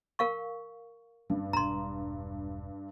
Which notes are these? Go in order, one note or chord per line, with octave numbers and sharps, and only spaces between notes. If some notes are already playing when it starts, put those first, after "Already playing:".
A#4 F5 C#6
G1 G2
E1 A#5 C6